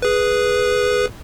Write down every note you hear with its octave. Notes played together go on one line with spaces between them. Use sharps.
G#4 B4